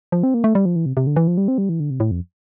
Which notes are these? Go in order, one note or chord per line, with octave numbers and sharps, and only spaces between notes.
F3
C4
A#3
A3
G3
F3
E3
C3
C3
D3
E3
F3
G3
C4
G3
E3
D3
C3
A2
F2